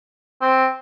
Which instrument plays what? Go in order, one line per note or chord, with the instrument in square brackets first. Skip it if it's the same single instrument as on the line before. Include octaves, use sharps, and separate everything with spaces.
[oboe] C4